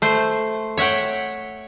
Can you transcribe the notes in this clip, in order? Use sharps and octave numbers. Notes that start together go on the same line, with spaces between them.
A3 C5
C#5 E5 F#5 G5